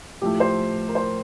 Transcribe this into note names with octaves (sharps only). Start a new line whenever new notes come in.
A2 F3 A3 G4
C5
A#4
C5